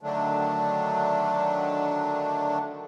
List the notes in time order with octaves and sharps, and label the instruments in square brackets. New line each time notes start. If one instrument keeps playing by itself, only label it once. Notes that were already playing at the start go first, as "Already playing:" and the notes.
[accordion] D3 D#3 F#3 A3 D4